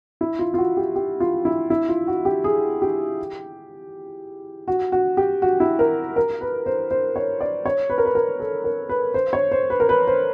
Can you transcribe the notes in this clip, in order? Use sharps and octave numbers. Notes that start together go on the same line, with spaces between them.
E4
F4
F4
F#4
G4
G4
F4
E4
E4
F4
F#4
G4
G#4
G4
F#4
F#4
G4
F#4
E4
A#4
A#4
B4
C5
C5
C#5
D5
C#5
B4
A#4
B4
A#4
A4
A#4
B4
C5
C#5
C5
B4
A#4
B4
C5